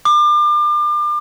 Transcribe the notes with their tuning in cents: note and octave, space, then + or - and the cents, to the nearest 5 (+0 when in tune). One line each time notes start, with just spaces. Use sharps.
D6 +35